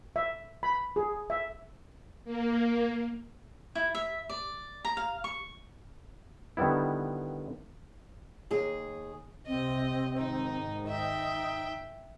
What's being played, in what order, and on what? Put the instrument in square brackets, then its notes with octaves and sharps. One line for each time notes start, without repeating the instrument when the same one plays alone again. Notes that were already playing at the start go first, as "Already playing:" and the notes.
[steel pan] E5
B5
G#4
E5
[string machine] A#3
[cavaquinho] E4
E5
D5
A#5
F5
C#6
[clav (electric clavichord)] D3 D#3 G3 B3 E4
[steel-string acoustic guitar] D#2 G#4
[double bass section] C2 C3 [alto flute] C4 [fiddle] D#5
[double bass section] G#2 D#3 [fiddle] D#4
[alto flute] D#4 [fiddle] E5 G5